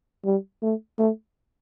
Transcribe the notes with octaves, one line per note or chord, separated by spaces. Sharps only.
G3
A3
A3